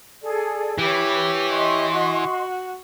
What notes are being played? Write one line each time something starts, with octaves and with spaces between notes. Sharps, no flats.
G#4 A4 D5
E3 G4 B4 C#5
D#5 C6 C#6
F#4